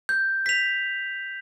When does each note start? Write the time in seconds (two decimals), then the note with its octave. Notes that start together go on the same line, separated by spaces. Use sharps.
0.09 G6
0.46 B6 F7